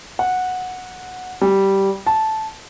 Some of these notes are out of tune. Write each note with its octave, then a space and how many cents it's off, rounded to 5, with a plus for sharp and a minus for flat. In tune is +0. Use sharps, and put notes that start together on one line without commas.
F#5 -10
G3 -10
A5 -10